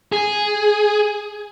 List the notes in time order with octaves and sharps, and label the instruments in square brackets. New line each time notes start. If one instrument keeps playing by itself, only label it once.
[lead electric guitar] G#4